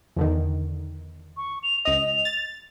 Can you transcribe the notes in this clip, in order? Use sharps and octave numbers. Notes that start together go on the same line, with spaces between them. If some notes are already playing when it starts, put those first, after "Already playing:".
E2 D3 D#3
C#6
F7
C#2 D#5 F7
A6